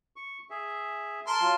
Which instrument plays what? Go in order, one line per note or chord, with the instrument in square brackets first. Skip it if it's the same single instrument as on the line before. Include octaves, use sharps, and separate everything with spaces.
[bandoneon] C#6
G#4 E5
[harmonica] A#4 A5 C6
[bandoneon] F#3 F4